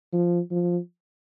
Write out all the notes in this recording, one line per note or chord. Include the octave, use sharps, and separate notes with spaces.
F3
F3